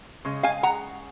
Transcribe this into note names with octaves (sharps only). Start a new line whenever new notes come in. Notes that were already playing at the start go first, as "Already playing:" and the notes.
C#3 G#3
F5 G#5
F#5 A#5